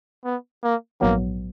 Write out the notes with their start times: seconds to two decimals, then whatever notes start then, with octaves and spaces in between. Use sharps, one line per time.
0.25 B3
0.63 A#3
1.01 A#1 G#2 F#3 A#3 B3